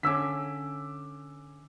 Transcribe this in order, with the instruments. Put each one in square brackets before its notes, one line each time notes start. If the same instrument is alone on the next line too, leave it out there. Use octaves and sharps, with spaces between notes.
[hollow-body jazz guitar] D3 C#4 [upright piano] D6 E6 B6